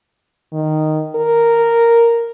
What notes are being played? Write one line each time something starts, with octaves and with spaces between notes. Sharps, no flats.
D#3
A#4